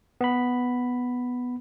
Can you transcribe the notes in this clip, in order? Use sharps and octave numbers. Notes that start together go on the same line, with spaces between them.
B3 B5